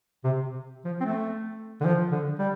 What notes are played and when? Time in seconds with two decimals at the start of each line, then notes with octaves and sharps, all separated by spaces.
0.24 C3
0.85 F3
1.01 C4
1.05 A3
1.81 D3
1.85 F3
2.11 D3
2.39 G3